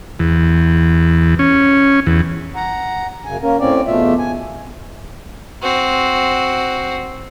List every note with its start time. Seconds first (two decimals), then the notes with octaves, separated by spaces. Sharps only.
0.19 E2
1.39 C#4
2.07 E2
2.56 F#5 A#5
3.25 F#2 C#3 G#5
3.42 A#3 C#4 A#4
3.59 A2 C4 C#4 D5
3.87 E2 B2 A3 F4 E5
4.19 G#5
5.62 C4 F#4